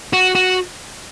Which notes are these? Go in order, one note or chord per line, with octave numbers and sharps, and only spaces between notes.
F#4
F#4